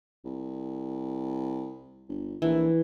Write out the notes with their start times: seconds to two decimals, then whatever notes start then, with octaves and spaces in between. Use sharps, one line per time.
0.25 C2
2.09 G1
2.42 A#1 E3